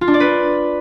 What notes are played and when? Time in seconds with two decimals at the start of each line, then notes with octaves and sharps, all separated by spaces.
0.01 F4
0.08 D4
0.14 D5
0.20 B4